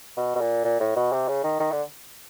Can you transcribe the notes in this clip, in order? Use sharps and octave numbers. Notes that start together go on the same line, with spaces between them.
B2
B2
A#2
A#2
A2
B2
C3
C#3
D#3
D#3
D3